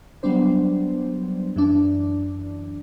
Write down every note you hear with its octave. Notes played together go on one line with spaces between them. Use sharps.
F#3 G3 B3 D4 C5
F#2 E3 D4